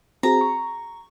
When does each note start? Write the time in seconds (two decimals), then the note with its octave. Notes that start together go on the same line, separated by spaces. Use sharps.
0.23 C4 F#4 G#4 A#5
0.41 C#6